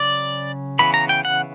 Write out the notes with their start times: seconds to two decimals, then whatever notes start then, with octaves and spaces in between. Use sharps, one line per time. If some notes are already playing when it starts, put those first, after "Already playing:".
Already playing: C#3 F#3 C#4 D5
0.79 C#3 E3 B3 B5
0.94 A#5
1.09 G5
1.25 F#5